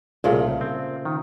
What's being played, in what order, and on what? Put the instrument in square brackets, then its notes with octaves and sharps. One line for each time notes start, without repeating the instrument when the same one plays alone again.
[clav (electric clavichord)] C2 [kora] A#2 C#3 A3
[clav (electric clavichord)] C4
D#3